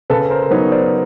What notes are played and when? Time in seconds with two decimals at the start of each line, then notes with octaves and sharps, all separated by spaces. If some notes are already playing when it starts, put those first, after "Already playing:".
0.10 C#3 A4 B4
0.30 A#4 C5
0.42 C5
0.50 F#3 B3 D#4 B4 C#5
0.71 C5 D5